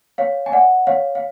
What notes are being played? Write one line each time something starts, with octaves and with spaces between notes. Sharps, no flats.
C#5 F5
G#5
D5 F#5
C#5 F5
F5